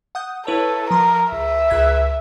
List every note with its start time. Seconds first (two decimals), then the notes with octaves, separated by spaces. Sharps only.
0.15 F#5 D#6 G6
0.47 E4 A4 B4 C#5
0.91 F3 A#4 C6
1.32 C#2 E5
1.70 C#2 F#6 G#6